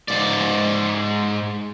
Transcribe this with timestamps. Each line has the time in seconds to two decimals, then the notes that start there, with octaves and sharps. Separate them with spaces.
0.08 G#2 D5